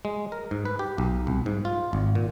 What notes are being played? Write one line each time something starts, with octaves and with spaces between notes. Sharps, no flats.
G#3
A#4
G#2
B4
G4
B1
C2
G#2
F4
G#1
A#2